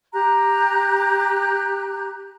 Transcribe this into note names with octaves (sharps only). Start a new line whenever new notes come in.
G4 A#5 F#6